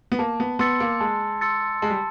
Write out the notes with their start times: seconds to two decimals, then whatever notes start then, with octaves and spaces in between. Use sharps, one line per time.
0.12 B3
0.19 A#3 A5
0.40 B3
0.59 B3 C6 E6 A6 C#7
0.80 A#3
1.01 G#3 A5
1.41 C6 E6 A6 C#7
1.82 G#3 A5
1.90 G3